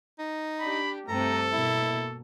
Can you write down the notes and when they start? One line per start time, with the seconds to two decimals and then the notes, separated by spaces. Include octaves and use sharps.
0.19 D#4
0.60 D4 G4 B5
1.08 G2 C3 A3 A4 A#5
1.53 B2 A#3 E4